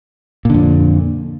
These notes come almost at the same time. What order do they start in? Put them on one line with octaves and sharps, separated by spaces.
A#2 D3 F2